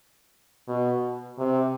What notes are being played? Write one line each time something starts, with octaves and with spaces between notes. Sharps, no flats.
B2
C3